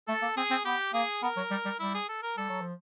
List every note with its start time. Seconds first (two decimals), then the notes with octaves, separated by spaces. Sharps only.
0.08 A3 A4
0.22 A#3
0.37 C4 G#4
0.51 C4
0.65 B3 G4
0.94 A#3 G#4
1.23 B3 A#4
1.37 F#3
1.51 G3
1.65 G3
1.80 G3 E4
1.95 G#4
2.09 A4
2.23 A#4
2.38 G3 A4
2.49 F#3
2.62 F3